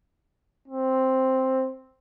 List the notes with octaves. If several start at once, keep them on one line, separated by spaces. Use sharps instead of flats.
C4